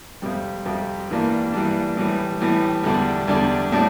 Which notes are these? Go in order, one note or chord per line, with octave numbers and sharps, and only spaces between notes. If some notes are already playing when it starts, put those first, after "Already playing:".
F2 C3 G3
F2 C3 G3
G2 E3 G3 A#3 D4
G2 E3 G3 A#3 D4
A2 E3 G3
A2 E3 G3
E2 D3 G3 D4
E2 D3 G3 D4
A2 G3 D4